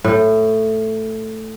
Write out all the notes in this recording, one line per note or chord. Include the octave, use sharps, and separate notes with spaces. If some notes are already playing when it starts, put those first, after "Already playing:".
A2